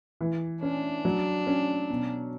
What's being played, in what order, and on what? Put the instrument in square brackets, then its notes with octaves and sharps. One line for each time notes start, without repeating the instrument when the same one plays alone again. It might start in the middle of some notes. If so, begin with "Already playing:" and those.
[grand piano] E3
[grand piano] C#4 [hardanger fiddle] D4
[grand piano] F#3
C#4
B2